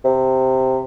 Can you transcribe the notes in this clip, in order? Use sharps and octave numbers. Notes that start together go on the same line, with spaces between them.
C3